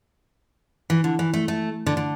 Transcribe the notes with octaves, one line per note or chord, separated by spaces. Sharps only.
E3
D3
E3
A3
A3
D3
D3